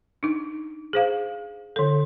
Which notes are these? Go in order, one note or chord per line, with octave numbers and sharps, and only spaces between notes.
D4 D#4
G#4 C5 F5
D3 A4